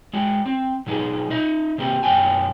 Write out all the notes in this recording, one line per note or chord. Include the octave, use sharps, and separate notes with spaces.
G#3 F#4
C4
B2 F#3 D#4 G#4
D#4 D#5 E5
C3 A#3 C4 G4
F#2 B2 F#3 G5 G#5